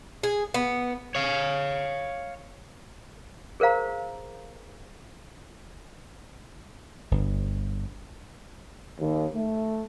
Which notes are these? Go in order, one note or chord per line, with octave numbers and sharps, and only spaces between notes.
G#4
B3
C#5 F5
G#4 A#4 C5 F5 A#5
G1
D#2
A3